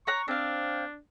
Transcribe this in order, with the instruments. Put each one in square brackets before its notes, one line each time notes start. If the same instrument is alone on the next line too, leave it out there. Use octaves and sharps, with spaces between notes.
[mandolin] C#5 A#5 F#6 [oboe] C#6
[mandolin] C4 F5 [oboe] D4